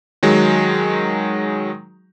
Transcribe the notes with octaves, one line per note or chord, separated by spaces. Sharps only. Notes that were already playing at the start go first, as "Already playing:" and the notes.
D#3 F#3 G#3